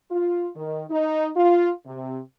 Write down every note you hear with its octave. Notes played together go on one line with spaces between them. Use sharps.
F4
D#3
D#4
F4
C3